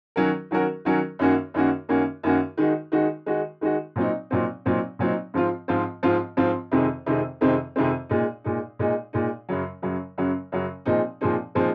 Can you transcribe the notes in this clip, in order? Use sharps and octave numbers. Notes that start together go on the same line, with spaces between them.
D#3 F#3 C#4 F#4 A#4
D#3 F#3 C#4 F#4 A#4
D#3 F#3 C#4 F#4 A#4
F#2 D#3 A#3 C#4 F#4
F#2 D#3 A#3 C#4 F#4
F#2 D#3 A#3 C#4 F#4
F#2 D#3 A#3 C#4 F#4
D#3 G#3 D#4 F#4
D#3 G#3 D#4 F#4
D#3 G#3 D#4 F#4
D#3 G#3 D#4 F#4
A#2 F#3 C4 D#4
A#2 F#3 C4 D#4
A#2 F#3 C4 D#4
A#2 F#3 C4 D#4
G#2 F3 C4 F4
G#2 F3 C4 F4
G#2 F3 C4 F4
G#2 F3 C4 F4
F2 C3 D#3 G#3 C4
F2 C3 D#3 G#3 C4
F2 C3 D#3 G#3 C4
F2 C3 D#3 G#3 C4
A#2 G#3 D#4
A#2 G#3 D#4
A#2 G#3 D#4
A#2 G#3 D#4
F#2 C#3 F#3
F#2 C#3 F#3
F#2 C#3 F#3
F#2 C#3 F#3
A#2 F3 G#3 C4 D#4
A#2 F3 G#3 C4 D#4
A#2 F3 G#3 C4 D#4